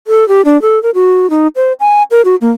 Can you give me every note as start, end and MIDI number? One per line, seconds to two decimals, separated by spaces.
0.07 0.27 69
0.28 0.42 67
0.45 0.60 62
0.62 0.81 69
0.83 0.90 70
0.95 1.30 66
1.30 1.47 63
1.56 1.73 72
1.80 2.03 80
2.11 2.22 70
2.25 2.36 66
2.41 2.51 58